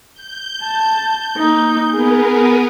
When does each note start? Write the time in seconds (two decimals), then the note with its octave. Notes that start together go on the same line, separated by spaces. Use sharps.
0.13 G6
0.63 A5
1.38 A#3 D#4
1.92 B3 G#4 A#4 B4